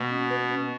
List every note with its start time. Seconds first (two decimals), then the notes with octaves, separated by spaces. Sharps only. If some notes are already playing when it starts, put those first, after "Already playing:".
Already playing: B2 A#3
0.10 C#4
0.30 B4
0.51 C#4